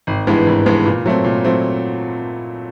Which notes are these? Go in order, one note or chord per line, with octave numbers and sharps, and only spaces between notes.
G#1
G2 E3 G#3 B3
G#1
G2 E3 G#3 B3
A#2
F#3 A3 C4
A#2
F#3 A3 C4